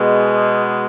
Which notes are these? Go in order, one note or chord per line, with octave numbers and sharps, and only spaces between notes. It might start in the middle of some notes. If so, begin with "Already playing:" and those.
Already playing: B2 G#3